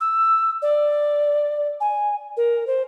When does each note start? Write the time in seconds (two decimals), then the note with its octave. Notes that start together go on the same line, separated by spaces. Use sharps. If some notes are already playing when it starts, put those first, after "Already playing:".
0.01 E6
0.62 D5
1.81 G#5
2.37 A#4
2.67 C5